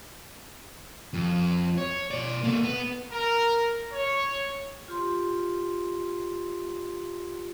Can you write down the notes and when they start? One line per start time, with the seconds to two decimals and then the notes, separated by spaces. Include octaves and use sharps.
1.14 F2
1.78 C#5
2.11 B2 D5
2.44 A#3 A4
2.64 B3
3.12 A#4
3.92 C#5
4.88 F4 G4 C6